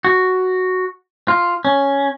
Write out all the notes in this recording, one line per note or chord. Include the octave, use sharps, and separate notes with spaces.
F#4
F4
C#4